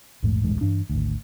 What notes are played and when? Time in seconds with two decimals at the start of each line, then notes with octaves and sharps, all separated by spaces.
0.23 A#1 E2 G#2 A3
0.41 D#1 A1 G2 G#3
0.61 G2 E3 D4
0.90 G#1 D2